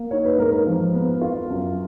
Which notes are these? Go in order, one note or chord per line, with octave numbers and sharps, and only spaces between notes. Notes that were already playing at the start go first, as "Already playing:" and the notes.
Already playing: A#3
D#4 C#5
B4
G#2 A#4
A#4
F3
B3
F4
F#2